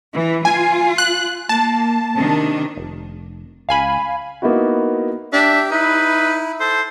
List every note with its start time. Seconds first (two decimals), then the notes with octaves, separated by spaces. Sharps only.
0.14 E3
0.45 F4 G#5
0.98 F#6
1.49 A#3 A5
2.14 C3 D#3 D4
2.77 F1
3.69 C#2 F5 G#5 B5
4.42 A#3 B3 D#4 E4 F#4
5.33 D4 G4 E5
5.71 D#4 E4 B4
6.60 A4 C5